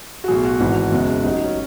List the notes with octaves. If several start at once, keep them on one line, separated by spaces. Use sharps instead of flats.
F#4
B1 A2 F#3 G#4
F#4
G#1 G#2 E3
F#1 E2 C#3 G#3
A1 A2 F#3 D#4
D#4
C#4